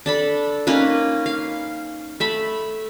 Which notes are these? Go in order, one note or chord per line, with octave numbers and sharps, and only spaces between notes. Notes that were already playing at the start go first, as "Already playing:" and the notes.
D4 A4 B5
A#3 C#4 D#4 B4
F5
A3 E5 B5